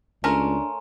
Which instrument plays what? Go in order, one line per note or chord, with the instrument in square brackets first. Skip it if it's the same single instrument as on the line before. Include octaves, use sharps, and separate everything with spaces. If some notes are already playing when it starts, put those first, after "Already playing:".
[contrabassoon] C#2 [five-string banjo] A3 C#4 A#4 [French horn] D4 [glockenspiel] G#5 A#5 C6